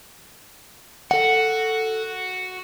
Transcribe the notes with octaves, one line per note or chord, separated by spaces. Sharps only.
F#4 A4 F#5